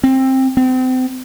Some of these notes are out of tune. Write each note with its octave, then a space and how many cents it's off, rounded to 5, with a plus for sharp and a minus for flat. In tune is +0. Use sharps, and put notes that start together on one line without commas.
C4 +15
C4 -35